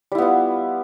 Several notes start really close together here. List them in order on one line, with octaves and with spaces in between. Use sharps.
G3 E4 B3 F4